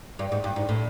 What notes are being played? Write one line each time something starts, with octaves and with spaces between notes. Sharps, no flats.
G2
G#2
G2
G#2
A2